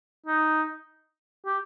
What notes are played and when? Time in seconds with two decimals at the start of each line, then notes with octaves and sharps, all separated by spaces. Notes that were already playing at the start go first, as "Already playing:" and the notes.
0.26 D#4
1.45 G4